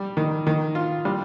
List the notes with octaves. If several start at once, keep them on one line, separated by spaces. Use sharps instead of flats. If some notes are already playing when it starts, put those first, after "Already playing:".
Already playing: G3
D#3
D#3
F4
G3